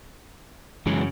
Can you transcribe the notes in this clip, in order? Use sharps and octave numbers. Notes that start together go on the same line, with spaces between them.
F#2 C#3 E3 F#3 G#3